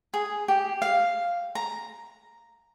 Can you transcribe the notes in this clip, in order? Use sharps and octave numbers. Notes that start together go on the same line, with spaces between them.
G#4
G4
F5
A#5